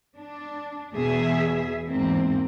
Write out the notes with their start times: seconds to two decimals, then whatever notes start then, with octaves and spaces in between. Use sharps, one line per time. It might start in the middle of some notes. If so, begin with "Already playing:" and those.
0.17 D4
0.93 E2 B2 G#4 E5
1.88 E2 G#2 A#3 C4